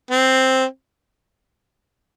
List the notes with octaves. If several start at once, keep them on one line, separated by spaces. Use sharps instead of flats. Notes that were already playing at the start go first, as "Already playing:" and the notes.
C4